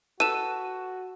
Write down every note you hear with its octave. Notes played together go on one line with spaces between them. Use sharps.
F#4 A4 B4 D#7 E7